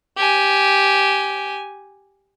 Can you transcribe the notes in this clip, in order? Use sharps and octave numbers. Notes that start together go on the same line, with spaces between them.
G4 G#5